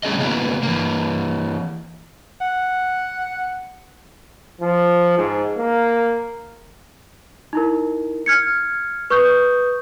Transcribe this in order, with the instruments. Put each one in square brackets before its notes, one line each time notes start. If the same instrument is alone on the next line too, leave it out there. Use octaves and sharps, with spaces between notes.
[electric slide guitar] G3 A3 C#4 G#4 D#5
C#3 E3 F#3 A#3 B3
E3 A#3
[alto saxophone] F#5
[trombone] F3
G#2
A#3
[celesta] D#4 E4 A#4
F6 G#6 C#7
B4 C#6 D#6 G6